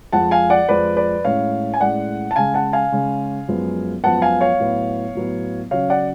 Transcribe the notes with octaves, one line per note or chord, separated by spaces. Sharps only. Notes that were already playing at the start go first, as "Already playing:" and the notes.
F2 F3 G#3 F#5 A5
F5 G#5
D5 F#5
F2 F3 G#3 B4 D5
B4 D5
A2 G#3 C#4 C#5 F5
G#5
A2 G#3 C#4 D5 F#5
A5
C#3 G#3 C#4 F5 G#5
F#5 A5
F5 G#5
C#3 G#3 C#4
F#2 F3 G#3 B3
F#2 F3 G#3 B3 F#5 A5
F5 G#5
C#5 F5
A2 F#3 B3
A2 F#3 B3
C#3 F#3 C#4 C#5 F5
D5 F#5